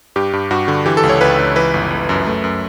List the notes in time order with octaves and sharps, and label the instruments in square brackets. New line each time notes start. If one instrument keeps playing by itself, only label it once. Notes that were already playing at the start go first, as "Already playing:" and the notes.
[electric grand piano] G2 G4
G2
G2 F#4
D3
E3 G4
A4
C#2
C#5
C#2 B4
C#2
E3 B4
G1
G1
F#2
A3
F#2